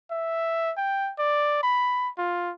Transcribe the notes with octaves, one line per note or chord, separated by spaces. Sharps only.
E5
G5
D5
B5
F4